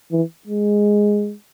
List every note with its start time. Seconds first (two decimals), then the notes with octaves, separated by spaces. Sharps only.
0.12 E3
0.47 G#3